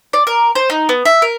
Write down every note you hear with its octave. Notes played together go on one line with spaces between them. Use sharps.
D5
A#4
C5
D#4
B3
E5
A#4